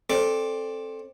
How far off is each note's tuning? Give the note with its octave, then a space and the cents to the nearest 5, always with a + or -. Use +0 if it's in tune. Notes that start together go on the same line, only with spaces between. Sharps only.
C4 +15 A4 +0 D5 +0